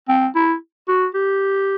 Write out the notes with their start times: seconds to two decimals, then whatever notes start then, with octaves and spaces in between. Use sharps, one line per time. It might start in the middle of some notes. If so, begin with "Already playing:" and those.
0.08 C4
0.35 E4
0.88 F#4
1.14 G4